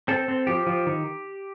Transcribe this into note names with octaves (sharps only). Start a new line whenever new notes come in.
C4 A4
C4
F3 G4
F3
D#3